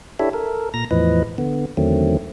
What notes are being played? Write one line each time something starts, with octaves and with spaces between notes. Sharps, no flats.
D4 E4 G4 A4 C#5 E5
A4 A#4
A#2 A#5 A#6
E2 A2 E3 F3 B4 D#5
D3 B3
E2 D3 D#3 F#3 A3 C4